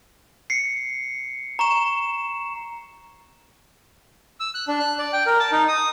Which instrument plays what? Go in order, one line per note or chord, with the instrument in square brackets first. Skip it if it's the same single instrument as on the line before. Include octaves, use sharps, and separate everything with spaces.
[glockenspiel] C7 C#7
A#5 C#6 E7
[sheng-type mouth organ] E6
F#6
D4
F#6
D5
G5
A#4
A5
D#4
D#6